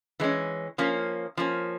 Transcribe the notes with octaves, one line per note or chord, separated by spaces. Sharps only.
E3 G#3 C#4
F3 A#3 C#4
F3 A#3 C#4